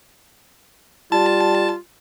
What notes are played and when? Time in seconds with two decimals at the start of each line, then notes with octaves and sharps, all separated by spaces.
1.12 G3 F4 A5